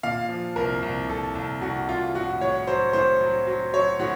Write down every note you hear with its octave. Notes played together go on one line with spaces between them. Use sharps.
A#2 F5
F3
C2 A#4
C2
C2 A4
C2
C2 F#4
C2 F4
A2 F#4
A2 C#5
F#3 C5
A2 C5
F#3
F#3
F#3 C#5
A2 F#4